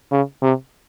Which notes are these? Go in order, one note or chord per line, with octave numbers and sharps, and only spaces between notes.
C#3
C3